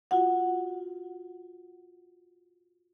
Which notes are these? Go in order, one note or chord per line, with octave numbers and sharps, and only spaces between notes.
F4 F#4 F#5